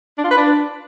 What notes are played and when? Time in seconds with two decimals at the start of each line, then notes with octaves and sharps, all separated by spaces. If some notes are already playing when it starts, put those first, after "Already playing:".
0.18 D4
0.25 F4
0.31 B4
0.37 D4